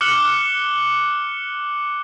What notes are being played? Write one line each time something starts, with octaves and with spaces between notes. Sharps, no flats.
D6 F6 F#6 C#7 F#7 G7